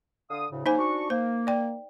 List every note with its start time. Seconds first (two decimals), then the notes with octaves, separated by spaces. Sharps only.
0.30 D3 F5 D#6
0.51 D2 A2 C#3
0.66 C#3 F#3 A#3 D#4 C5 G#5
0.78 D4 F#4 C#6
1.10 A#3 C5
1.47 D5 G5